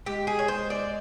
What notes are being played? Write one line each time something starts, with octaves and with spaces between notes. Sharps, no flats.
G#3 G4
G#4
C#5
C5
D5